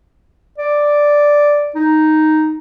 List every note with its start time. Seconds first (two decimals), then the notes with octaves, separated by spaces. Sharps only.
0.58 D5
1.75 D#4